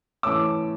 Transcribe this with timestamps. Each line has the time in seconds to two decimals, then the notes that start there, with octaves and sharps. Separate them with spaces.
0.23 E3 A3 C#4 D6 E6